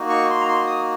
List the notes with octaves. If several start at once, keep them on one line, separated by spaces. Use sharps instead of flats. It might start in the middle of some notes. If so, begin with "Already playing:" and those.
Already playing: A#3 D#4 F#4
C#6
C6
A#5
C6
D#6